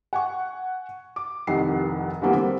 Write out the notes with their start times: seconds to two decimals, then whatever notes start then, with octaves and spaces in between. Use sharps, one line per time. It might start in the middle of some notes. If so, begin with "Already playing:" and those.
0.13 F#5 G#5 C#6
1.16 D6
1.47 F1 C2 D#3 F#5 C7
2.22 D3 E3 F#3 G3 A#3 B3
2.33 D3 G3 C4